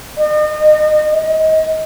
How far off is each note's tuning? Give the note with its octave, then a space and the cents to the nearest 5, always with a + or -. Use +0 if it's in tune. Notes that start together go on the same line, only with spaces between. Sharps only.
D#5 -40
D#5 +25